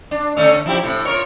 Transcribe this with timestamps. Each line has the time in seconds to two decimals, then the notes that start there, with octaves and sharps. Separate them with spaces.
0.11 D4
0.37 D3 A3 C#4
0.66 F3 E4 G4
0.83 A2 C3
1.05 F4 A#4 C#5